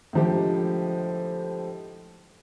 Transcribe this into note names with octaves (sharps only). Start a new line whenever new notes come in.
A2 D3 F3 G#3 G4